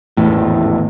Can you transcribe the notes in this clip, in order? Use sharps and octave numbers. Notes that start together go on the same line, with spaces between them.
G#1 E2 A2